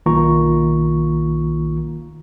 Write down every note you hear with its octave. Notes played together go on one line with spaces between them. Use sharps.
B1 D#3 A#3 F4 A#5 C#6